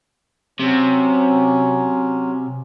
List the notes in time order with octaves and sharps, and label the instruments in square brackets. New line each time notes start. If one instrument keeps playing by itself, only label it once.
[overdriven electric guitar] C3 [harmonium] F#3 C#4